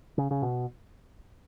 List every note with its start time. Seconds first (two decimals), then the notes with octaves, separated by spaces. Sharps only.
0.18 C#3
0.31 C#3
0.42 B2